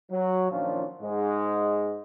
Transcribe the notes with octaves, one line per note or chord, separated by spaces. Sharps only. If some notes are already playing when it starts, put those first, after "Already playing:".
F#3
A#2 D#3 F3 C#4 D4 F4
G#2 G#3